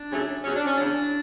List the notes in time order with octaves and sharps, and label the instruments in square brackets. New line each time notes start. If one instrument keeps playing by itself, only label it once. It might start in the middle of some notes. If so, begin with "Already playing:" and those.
Already playing: [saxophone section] D4
D#2 C#3 F#3 A3 C#4
E2 C#3 F#3 C#4
D4
C#4
E2 C#3 F#3 D4